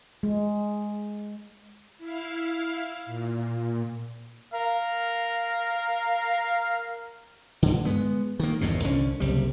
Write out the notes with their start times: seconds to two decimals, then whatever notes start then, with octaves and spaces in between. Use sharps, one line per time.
0.23 G#3
1.98 E4 F5
3.05 A#2
4.53 A#4 F5
7.62 G2 D3
7.85 G#3 B3
8.40 D#3 A#3
8.61 G1 E2 G2 B2
8.84 C2 D3 C#4
9.20 F#1 C2 G3